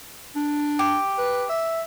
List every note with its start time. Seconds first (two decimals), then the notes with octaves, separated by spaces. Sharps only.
0.36 D4
0.79 G4
1.18 B4
1.49 E5